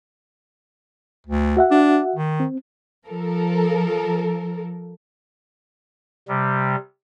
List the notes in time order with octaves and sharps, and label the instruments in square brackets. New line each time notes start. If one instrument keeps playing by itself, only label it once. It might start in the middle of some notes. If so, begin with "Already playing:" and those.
[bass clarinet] D2
[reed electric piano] F#4 E5 F#5
[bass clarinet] D4
D#3
[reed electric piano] C4
[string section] F3 A4 A#4
[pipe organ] C3 G3